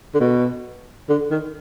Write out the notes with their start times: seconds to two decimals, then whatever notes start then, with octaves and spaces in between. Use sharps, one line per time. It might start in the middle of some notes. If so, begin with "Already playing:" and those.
0.14 D3
0.20 B2
1.09 D3
1.31 D#3